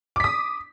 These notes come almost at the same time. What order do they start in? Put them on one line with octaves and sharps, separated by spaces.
D6 B6 D#6